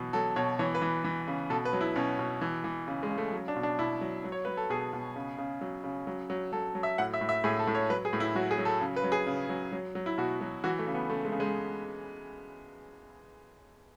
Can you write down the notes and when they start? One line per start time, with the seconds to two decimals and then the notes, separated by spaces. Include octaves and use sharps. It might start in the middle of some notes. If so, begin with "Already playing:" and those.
Already playing: B2 E3 F#3
0.13 F#3 A4
0.36 B2 C#5
0.59 E3 C#5
0.75 B4
0.82 E3
1.04 E3
1.28 C#3
1.50 B2 A4
1.65 B4
1.73 F#3
1.81 E4
1.96 B2 C#4
2.19 B2
2.41 E3
2.64 E3
2.88 C#3
3.03 G#3
3.10 C#3
3.18 A3
3.33 F#3
3.48 D4
3.56 B2
3.63 D4
3.79 B2 E4
4.01 F#3
4.24 F#3
4.32 C#5
4.45 F#3 B4
4.57 A4
4.70 B2 G#4
4.93 B2
5.16 C#3
5.38 C#3
5.61 F#3
5.84 C#3
6.07 F#3
6.30 F#3
6.53 F#3 A4
6.75 F#3
6.83 E5
6.98 A2 F#5
7.14 E5
7.21 A2
7.29 E5
7.44 A2 G#4
7.59 A4
7.67 A2
7.75 C#5
7.90 F#3 B4
8.05 G#4
8.13 A2
8.20 E4
8.35 F#3 F#4
8.51 G#4
8.58 F#3
8.65 A4
8.81 C#3
8.96 B4
9.04 F#3
9.12 G#4
9.27 C#3
9.49 F#3
9.72 F#3
9.95 F#3
10.06 E4
10.18 B2 F#4
10.41 F#3
10.64 E3 F#4
10.79 A3
10.87 C#3
10.94 B3
11.10 C#3 A3
11.25 G#3
11.32 C#3
11.40 G#3